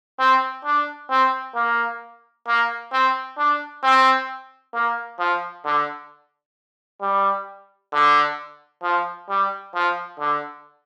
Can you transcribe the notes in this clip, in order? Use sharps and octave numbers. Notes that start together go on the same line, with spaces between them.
C4
D4
C4
A#3
A#3
C4
D4
C4
A#3
F3
D3
G3
D3
F3
G3
F3
D3